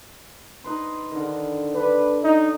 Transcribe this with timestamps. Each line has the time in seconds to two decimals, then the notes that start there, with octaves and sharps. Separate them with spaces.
0.64 D#4 B4 C6
1.12 D3 D#3
1.74 D4 B4
2.24 D#4